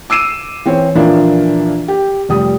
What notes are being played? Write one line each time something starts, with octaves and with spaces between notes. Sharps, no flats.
D6 E6 C7 D#7 E7
E3 C4 C#5
A#2 E3 F3 A#3 D4 E4
G4
F1 G3 D#6